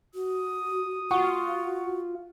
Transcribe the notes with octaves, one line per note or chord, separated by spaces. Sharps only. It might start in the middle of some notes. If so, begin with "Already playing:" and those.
F#4 D#6
F4 F#4 F#5 C#6